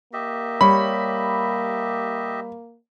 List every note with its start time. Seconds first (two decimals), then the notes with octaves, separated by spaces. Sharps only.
0.13 A#3 G4 D#5 E5
0.61 G3 C#5 B5